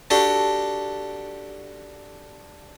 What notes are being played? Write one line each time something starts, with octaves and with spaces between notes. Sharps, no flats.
D4 F#4 G4 A4